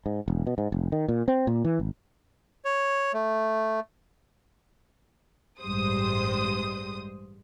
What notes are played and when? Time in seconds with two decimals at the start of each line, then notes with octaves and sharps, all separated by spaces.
0.06 G#2
0.28 E1
0.47 B2
0.58 G#2
0.72 F1
0.92 D#3
1.08 A#2
1.28 C4
1.47 A#2
1.65 E3
1.79 G#1
2.65 C#5
3.14 A3
5.61 A1 G2 G3 G#3 C5 D#6